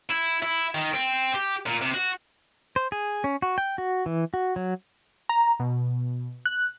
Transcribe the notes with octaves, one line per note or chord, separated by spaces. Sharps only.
E4
E4
D#3
C4
G4
A#2
C3
F#4
C5
G#4
C#4
F#4
G5
F#4
E3
F#4
F#3
A#5
B2
F#6